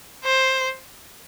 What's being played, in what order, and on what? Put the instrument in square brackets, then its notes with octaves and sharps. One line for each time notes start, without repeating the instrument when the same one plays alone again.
[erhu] C5